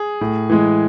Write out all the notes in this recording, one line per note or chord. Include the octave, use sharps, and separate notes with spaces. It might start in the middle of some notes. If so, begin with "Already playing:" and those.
Already playing: G#4
A2
E3 G#3